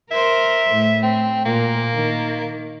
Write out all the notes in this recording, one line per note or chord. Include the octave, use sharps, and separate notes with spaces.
A#4 C5 E5
A2
C4
A#2 A#3
D#3